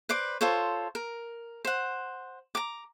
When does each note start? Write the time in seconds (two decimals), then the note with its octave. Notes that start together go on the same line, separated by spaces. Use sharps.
0.09 B4 C5 D5 D6
0.41 F4 A4 C5 C#5
0.95 A#4
1.65 C5 F#5
2.55 A#5 D6